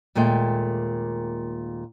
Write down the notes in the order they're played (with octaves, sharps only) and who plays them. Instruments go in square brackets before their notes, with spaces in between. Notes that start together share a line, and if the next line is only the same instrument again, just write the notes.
[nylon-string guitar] D#2 A#2 G#3 A3 G5